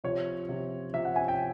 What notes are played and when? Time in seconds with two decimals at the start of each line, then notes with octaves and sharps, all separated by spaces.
0.04 C3 F3 C#5
0.49 C3 F3
0.93 C3 F3 E5
1.05 F#5
1.16 G#5
1.28 G5